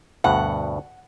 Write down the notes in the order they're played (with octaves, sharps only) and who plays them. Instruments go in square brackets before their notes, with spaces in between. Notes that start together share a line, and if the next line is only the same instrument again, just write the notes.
[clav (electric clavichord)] D2 G2 B2 [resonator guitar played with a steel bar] F#5